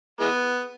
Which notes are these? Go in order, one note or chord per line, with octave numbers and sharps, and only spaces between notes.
E3 G#3 B3